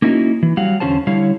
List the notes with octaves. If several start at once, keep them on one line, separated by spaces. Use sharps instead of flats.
A#3 C#4 D#4 E4 F#4
E3
F#3 G3 F5 F#5
E2 D3 C#4 F#4 C5 A5
D3 G3 E4 C#5 F5